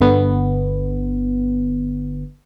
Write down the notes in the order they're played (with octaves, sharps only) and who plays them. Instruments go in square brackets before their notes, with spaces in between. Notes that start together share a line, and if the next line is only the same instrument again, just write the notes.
[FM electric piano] G1 D3 B3